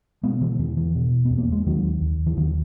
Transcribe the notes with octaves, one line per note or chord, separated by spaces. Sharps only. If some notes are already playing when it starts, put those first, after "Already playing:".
B2 G#3 B3
E3 G#3
E2 E3
E3
B2
E2 B3
A#3
G#3
D#2 D#3 F#3
D#2
E3
D#2 D#3 F#3